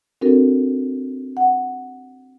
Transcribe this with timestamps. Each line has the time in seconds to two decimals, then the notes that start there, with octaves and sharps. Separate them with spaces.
0.21 C4 D4 F#4 A4 A#4
1.37 F#5